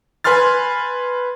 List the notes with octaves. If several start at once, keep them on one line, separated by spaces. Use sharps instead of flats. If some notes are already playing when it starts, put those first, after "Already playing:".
B4 G#5 C6 F6 A6